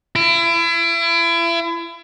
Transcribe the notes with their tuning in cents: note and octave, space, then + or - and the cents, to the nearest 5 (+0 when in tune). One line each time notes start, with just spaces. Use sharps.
E4 +35